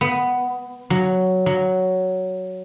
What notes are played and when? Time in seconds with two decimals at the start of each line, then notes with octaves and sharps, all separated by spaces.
0.01 B3
0.90 F#3
1.46 F#3